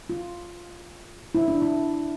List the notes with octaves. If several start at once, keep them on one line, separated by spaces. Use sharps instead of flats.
F4
E4
D4
E4